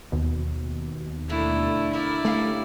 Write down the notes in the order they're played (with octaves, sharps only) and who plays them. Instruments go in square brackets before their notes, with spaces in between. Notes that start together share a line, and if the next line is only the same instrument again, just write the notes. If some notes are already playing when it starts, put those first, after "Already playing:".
[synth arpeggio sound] D#2 B2
[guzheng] D3 A#3 D4 [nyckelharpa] A3 E4
[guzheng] A#3 A#4 [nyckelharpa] E4 D5
[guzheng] G3 A#3 C#4 [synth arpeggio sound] A3 F5